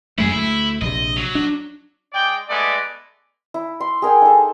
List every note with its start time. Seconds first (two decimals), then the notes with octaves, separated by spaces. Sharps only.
0.18 F#2 G#3 A3 E4 G#4
0.32 D2 A3 E4
0.81 A#1 C3 D#5
1.16 F#3
1.35 D4
2.13 G#3 D5 G5
2.49 G#3 A3 B3 D5
3.54 E4
3.80 C6
4.02 G#4 A#4 G5 G#5
4.22 D#4 A4